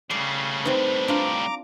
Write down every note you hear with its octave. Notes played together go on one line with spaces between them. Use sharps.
A2 C#3 G3 D5 C7
C4 D#4 B4 C5
D4 F4 A#5 D6